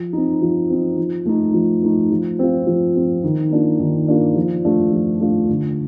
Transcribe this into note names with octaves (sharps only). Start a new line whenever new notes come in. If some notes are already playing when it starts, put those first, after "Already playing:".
Already playing: F3
C4 D#4
F3
C4 D#4
F3
A3 D#4
F3
A3 D#4
F3
C4 F4
F3
C4 F4
D#3
A#3 D4 F4
D#3
A#3 D4 F4
F3
A3 D4 F4
F3
A3 D4 F4
D3